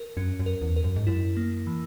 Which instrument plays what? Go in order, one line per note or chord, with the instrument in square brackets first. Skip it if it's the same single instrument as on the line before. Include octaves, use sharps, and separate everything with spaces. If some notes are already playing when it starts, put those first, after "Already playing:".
Already playing: [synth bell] A#4
[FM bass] F#2 [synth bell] C#4
[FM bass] F#2
[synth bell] A#4
[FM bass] E2
[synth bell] A#4
[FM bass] F#2
G#2
[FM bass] F#2 [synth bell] E4
[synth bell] A#3
E3